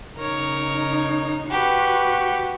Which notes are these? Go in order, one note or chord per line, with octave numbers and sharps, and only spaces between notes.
C#3 D#4 A#4 C#5
F#4 G4 B4